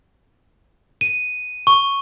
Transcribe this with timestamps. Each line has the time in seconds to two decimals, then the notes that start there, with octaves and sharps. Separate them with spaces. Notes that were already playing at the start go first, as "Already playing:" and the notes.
1.01 D#7
1.67 C#6